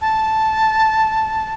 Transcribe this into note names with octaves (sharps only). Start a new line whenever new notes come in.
A5